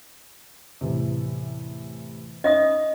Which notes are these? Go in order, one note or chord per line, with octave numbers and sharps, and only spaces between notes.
E2 A2 C3
C#4 D#4 D#5 E5 D#6